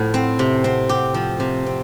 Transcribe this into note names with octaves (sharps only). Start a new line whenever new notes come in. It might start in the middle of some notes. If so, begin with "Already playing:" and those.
Already playing: A2 F3
C4
C3
C4
G4
F3
C3
C4